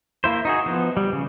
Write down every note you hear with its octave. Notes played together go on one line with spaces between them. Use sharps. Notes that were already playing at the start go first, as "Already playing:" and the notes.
A#3 E4 C5
D#4 F#4 G#4
F3 B3
G3
C#3